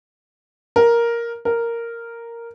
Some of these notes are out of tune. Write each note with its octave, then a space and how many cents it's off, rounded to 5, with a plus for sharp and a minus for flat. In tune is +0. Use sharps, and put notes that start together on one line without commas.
A#4 +5
A#4 -5